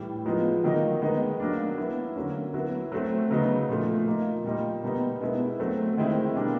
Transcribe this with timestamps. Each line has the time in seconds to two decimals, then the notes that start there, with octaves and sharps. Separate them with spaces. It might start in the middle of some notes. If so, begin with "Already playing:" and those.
Already playing: A2 E3 G3
0.26 F3 G#3 B3 D#4
0.64 D#3 F#3 A#3 D#4
1.02 D#3 G#3 B3 D#4
1.39 F#3 A#3 D4
1.78 F#3 B3 E4
2.16 D3 F#3 A#3 C#4
2.54 F#3 B3 E4
2.92 F#3 A3 C4
3.31 C#3 F#3 B3 D#4
3.68 A#2 F3 A3
4.07 F3 A#3 D#4
4.44 A#2 G3 A#3 D#4
4.83 B2 G3 B3 D#4
5.21 B2 G#3 B3 E4
5.59 F#3 A3 C4
5.97 D#3 G#3 C4 E4
6.35 B2 G3 A#3 D4